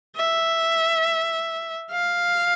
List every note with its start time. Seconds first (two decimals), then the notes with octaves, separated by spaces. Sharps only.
0.16 E5
1.91 F5